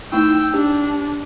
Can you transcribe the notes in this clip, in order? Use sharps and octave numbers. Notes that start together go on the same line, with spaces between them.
A3 D#4 E4 G5 E6
D4 G4